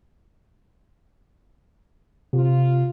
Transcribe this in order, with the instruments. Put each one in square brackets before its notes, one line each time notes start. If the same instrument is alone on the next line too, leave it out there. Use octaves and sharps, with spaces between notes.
[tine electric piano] C3 [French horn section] F4